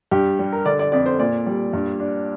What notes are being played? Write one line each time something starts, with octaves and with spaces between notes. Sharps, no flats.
G2 G4
G3
A#4
D3 D5
D5
F2 D5
C5
A#2 D5
G3
G2
D4